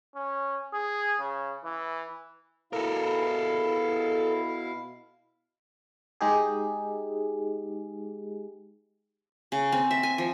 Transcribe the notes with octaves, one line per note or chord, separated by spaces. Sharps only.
C#4
G#4
C#3
E3
B2 E4 A4 A#4 F5
G#3 D#4 G4 G#4
C#3
C4
E5
G#5
F3